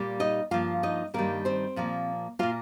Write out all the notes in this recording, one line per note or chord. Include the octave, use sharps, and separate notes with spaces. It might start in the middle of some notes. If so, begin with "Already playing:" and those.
Already playing: A#2 G3 A#3
D#4 D#5
G2 F3 A#3 F4 F5
D#4 D#5
G2 D#3 G3 A#3 A#4
C4 C5
A#2 F3 A#3
A#2 A#3 F4 F5